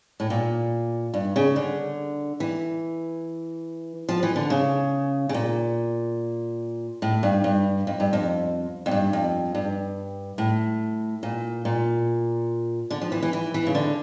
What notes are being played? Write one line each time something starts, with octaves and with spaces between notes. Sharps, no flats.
A2
A#2
G2
C#3
D3
E3
F3
E3
D3
C#3
C#3
A#2
A2
G2
G2
F2
G2
F2
F2
G2
F2
G2
A2
A#2
A#2
D3
F3
E3
E3
E3
E3
C#3
D3